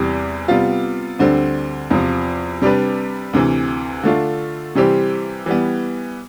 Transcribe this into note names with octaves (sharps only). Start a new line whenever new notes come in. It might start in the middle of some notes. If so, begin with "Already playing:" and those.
Already playing: E2 C3 E3 G3
C3 G3 B3 F4
D2 D3 G3 C4
E2 C3 F3
C3 G3 D4 G4 B4
D2 C3 E3
D3 A3 D4 F4
C3 E3 G3 C4 G4
E3 G3 B3